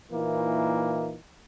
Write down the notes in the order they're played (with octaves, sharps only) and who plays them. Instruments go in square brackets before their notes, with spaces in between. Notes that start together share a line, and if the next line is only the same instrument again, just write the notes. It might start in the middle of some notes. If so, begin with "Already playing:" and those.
[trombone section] A#2 E3 A#3 D#4 E4